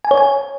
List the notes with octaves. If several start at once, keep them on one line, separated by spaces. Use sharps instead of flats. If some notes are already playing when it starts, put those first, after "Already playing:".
G#5
C#5
G#5